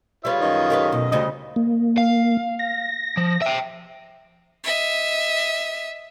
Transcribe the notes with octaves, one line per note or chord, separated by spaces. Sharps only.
G3 F4 B4 C#5 F5
F#2 D#3 D#5
G4 A#4 B4
B2
D2 C#3 G3 C5 D#5
A#3
F5
A#6
F3
E5 G5
D#5 E5